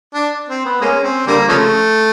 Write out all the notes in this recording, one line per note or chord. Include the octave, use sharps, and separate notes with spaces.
D4
C4
B3
G#3 A#3 C#4
C4
D3 G3 A#3
C#3 F3 A3